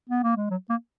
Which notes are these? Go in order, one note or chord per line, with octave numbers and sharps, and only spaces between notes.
B3
A#3
G#3
F#3
A#3